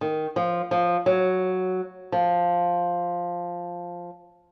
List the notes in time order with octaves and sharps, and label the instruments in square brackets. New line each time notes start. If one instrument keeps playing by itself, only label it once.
[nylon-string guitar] D#3
F3
F3
F#3
F3